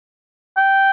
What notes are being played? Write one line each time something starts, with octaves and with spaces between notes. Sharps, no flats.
G5